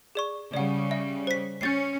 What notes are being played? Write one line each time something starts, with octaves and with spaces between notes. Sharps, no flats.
G#4 D5 C#6
C#3 G3 D5 F#5
E5
C5 B6
C#4 G6 A6 C7